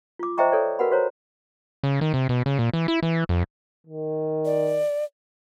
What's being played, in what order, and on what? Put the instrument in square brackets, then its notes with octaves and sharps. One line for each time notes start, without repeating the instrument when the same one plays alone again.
[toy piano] F4 D6
C5 D#5 E5 G5 A#5 C#6
A4 C#5 D5
F#4 A#4 B4 F#5 G#5 B5
F#4 C5 C#5 A#5
[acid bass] C#3
D#3
C3
B2
C#3
A#2
E3
E4
E3
F2
[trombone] D#3
[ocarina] D5